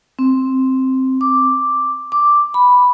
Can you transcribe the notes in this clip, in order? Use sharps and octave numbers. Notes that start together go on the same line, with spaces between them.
C4
D6
D6
B5